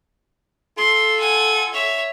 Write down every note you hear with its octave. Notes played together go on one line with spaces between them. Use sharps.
F4 A4 C6
F#5 G#5
C#5 E5